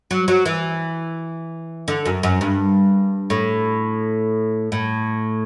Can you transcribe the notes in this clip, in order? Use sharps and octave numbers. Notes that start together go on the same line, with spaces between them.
F#3
F#3
E3
D3
F#2
F#2
G2
A2
A2